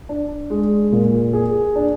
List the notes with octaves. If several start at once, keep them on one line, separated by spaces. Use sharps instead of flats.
D4
G#3
A#2
G#4
D4